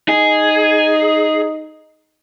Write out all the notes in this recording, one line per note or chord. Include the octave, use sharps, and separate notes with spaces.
D#4 G#4